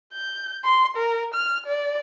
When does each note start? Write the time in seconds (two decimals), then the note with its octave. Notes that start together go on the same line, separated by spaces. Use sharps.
0.14 G6
0.65 C6
0.97 A#4
1.34 F6
1.66 D5